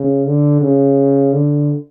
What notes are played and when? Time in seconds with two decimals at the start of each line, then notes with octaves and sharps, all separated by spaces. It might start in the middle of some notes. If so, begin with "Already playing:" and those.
Already playing: C#3
0.26 D3
0.62 C#3
1.33 D3